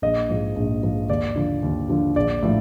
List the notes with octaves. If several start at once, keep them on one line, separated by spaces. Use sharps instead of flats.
A#1 D#5
G#2 F3
A#1
G#2 F3
D#2 D5
D3 F3
D#2
D3 F3
A#1 D5
A2 F3